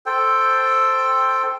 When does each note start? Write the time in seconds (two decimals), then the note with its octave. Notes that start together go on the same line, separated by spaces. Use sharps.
0.06 A4 C5 G5